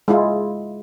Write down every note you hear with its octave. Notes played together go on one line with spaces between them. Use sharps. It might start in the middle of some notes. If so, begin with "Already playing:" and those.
G#3 E4 F4